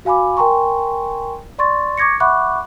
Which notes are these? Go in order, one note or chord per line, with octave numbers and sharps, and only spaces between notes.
F#4 F5 G#5 B5 D6
A#4 G5 G#5 A#5 C6 C#6
D5 C6 C#6 A6
C#6 D6 G#6 A#6 C#7
E5 F#5 B5 C#6 D6 F#6